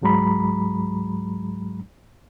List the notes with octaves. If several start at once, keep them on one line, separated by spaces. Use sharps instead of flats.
C#2 G#2 F#3 G#3 A#5 B5